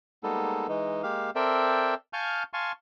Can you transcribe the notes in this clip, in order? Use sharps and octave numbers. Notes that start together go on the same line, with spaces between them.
G3 G#3 A#3 B3 D#4 A4
E3 G#3 D#4
G#3 A#3 G4 F5
C4 A4 A#4 D5 E5 G5
F5 G#5 A5 C#6 F6 G6
F5 G#5 A5 C6 C#6